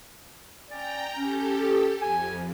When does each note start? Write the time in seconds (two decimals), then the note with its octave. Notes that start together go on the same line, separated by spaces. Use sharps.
0.69 C#4 D5 G5 A#5
1.17 C#4 G4 A4
2.01 F2 G#5